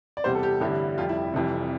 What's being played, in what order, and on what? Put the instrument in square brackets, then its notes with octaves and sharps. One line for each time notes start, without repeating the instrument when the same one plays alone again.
[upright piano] D5
E2 C3 G3 C5
A4
G4
A1 G2 D3 G3 E4
F1 F2 C3 G3 F4
E4
F1 F2 E3 G3